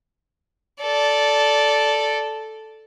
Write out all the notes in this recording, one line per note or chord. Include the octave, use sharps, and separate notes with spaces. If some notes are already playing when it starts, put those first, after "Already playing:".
A4 D5